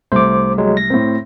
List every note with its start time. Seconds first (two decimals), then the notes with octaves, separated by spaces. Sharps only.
0.12 C2 A3 C5 D6
0.58 F#3 G#3
0.77 A#6
0.90 A2 C4